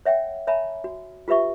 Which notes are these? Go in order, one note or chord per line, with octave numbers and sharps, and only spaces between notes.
C#5 E5 F#5 G5
C#5 E5 G#5 A#5 B5
F#4
F4 G4 B4 E5 C#6